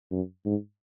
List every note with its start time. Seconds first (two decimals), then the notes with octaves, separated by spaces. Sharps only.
0.11 F#2
0.45 G#2